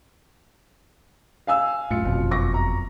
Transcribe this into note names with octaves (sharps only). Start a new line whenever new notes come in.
F5 G#5 E6
F#2 A2 F4 C#7
F#1 F2 B2
C#6 D6 A#6
A#5